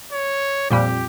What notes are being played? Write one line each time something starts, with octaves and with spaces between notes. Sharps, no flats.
C#5
F2 A#2 G3 G4